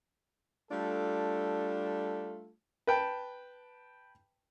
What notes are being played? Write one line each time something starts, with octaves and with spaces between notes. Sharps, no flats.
G3 A3 D4 F4 A4
B4 G5 A5